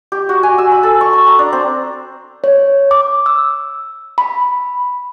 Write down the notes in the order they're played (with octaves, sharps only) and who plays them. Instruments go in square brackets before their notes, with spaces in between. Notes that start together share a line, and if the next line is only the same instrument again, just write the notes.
[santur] G4
F#4
G#5
E6
B5
A4
C#6
B5
A#5
D4
C4
[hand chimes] C#5
D6
E6
B5